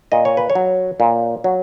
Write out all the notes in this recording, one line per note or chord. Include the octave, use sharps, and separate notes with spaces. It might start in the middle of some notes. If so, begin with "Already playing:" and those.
A#2 D#5
C#5
B4
C#5
F#3
A#2
F#3